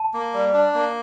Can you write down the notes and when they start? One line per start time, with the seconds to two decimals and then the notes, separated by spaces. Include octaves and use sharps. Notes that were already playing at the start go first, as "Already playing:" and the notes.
Already playing: A5
0.13 A#3
0.34 G3
0.53 D4
0.74 A#3